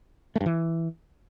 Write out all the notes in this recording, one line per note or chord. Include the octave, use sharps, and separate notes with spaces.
A3
G2
E3